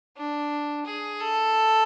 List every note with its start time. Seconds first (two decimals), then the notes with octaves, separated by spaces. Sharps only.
0.17 D4
0.86 G#4
1.20 A4